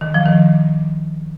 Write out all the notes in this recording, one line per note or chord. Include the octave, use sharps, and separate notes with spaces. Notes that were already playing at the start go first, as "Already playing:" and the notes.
D#3
F3
D#3